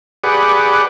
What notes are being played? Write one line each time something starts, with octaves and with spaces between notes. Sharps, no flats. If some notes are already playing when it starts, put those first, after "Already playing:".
G4 G#4 B4 D5 F#5